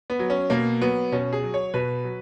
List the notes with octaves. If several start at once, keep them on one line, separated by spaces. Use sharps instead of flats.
B3
F#3
C#4
B2 A#3
F#3 B3
B2 C#4
G#4
F#3
C#5
B2 B4
F#3